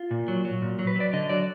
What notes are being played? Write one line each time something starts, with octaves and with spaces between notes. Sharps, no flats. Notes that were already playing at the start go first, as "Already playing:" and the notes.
Already playing: F4
A#2
F#3
F#3
A#2
F#3
B4
F#3 D5
D3 D#5
F#3 D5